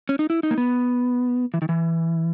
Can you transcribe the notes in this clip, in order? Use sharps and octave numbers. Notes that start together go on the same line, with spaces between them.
C#4
D#4
E4
D#4
A#3
B3
E3
D#3
E3